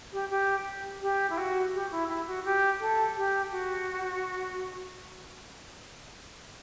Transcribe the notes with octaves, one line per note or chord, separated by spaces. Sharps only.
G4
G4
G4
E4
F#4
G4
E4
E4
F#4
G4
A4
G4
F#4